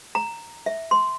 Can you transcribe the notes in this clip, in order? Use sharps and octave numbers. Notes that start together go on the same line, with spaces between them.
A#5
E5
C6